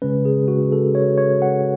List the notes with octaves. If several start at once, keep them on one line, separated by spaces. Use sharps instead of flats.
C#3 G#3 C#4 B4
G#4
F#4
A4
C#5
C#5
F#5